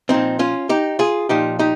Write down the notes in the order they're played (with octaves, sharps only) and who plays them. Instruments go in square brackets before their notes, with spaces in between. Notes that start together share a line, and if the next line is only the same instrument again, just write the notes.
[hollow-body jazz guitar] A#2 F3 C4 D#4
C#4 F4
D#4 G4
F4 G#4
A#2 F3 D#4 G4
D#4 G4